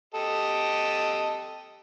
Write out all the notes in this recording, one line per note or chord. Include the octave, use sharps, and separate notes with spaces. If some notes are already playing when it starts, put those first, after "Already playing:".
G4 A4 D#5